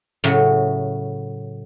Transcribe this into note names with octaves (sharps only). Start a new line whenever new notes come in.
A2 C#3 F#3